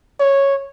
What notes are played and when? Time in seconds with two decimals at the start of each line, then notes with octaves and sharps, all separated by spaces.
0.20 C#5